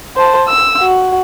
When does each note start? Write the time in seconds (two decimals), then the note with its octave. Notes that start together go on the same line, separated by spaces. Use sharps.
0.16 C5 A5
0.48 E6
0.80 F#4